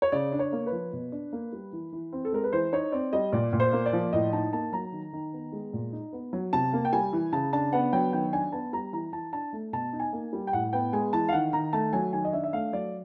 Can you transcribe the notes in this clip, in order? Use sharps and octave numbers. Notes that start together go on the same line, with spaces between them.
C#5
C#3 D5
D4
C#5
A#3
B4
F3
B2
D4
A#3
G3
E3
E3
C4
A4
G#3 A#4
B4
E3 C5
D#4 C#5
C4 D5
G3 D#5
A#2 D5
A#2
C5
A#3
D5
F3
A2 D#5
D#4 A5
A#3 A5
F#3 A#5
D#3
D#3
B3
G#3
A#2
D#4
B3
F#3
C3 A5
A#3
G5
G3 G#5
E3
C#3 A5
D4 A5
B3 F#5
F#3 G5
D#3 G5
D4 G#5
B3 A5
G3 A#5
E3 A#5
E3 A5
D4 A5
A3
B2 A5
D#4
G#5
A#3
G3
G5
A2 F#5
B3 G5
G#3 G#5
E3 A5
F5
D#3 F#5
D#3 A#5
A3 A5
F#3 G#5
D#3 G#5
D#5
D4 E5
E5
A3 F5
F#3 D5